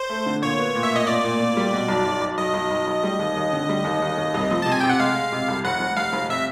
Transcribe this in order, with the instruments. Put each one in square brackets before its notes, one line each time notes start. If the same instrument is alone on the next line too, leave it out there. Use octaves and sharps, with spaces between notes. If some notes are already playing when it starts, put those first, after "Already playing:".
Already playing: [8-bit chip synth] C5
[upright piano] A3
D3
[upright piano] A#2 [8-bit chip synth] C#5
[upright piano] B3
A#2
[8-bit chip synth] E5
[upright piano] A#2 [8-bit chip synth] D#5
[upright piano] A#2 [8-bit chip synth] D5
[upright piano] A#2
A#2
G3
B2
B1
B1
B1
[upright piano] B1 [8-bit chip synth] D#5
[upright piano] B1
B1
B1
G3
D#2
D#2
D3
G3
D#2
D#2
D#2
C2
F3
[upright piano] C3 [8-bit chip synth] A5
[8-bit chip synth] G#5
[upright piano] C3 [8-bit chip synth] G5
[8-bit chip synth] F#5
[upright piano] G#3 [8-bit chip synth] F5
[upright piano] G#3
C3
C2
[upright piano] F1 [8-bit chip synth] F#5
[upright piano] F1
[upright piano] F1 [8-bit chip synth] F5
[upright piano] F1
[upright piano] C3 [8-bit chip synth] E5